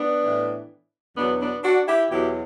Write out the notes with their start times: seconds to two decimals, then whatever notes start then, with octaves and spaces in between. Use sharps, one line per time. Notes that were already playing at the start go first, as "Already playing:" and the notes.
Already playing: B3 D4
0.23 A2 E3
1.17 E2 B2 F#3 B3 D4
1.41 B3 D4
1.64 D4 F#4
1.88 E4 G4
2.11 E2 B2 F#3 E4 G4